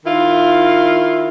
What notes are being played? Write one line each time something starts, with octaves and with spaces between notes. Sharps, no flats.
D#3 E4 F4